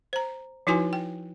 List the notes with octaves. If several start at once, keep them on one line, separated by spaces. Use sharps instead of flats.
C5 A#5
F3 D#4 E4 F#4 B4 G#5
G5